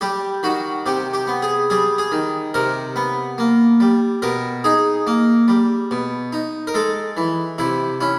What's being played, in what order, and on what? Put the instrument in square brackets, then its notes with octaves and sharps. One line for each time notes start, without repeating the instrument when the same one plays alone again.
[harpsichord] G3 G4
D#3 F#4
C3 G4
G4
B3
G#4
G3 G#4
G#4
D#3
C3 A#4
B3
A#3
G3
B2 A#4
D#4 G#4
A#3
G3
B2
D#4
A#4
G#3 A4
E3
C3 E4
C#4 E4